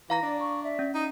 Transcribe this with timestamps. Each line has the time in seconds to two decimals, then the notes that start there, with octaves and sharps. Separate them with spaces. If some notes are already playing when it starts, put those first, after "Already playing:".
0.10 E3 F5 A#5 A#6
0.23 D4 D5
0.40 C#6
0.63 D5 E5
0.79 C#4
0.95 D#4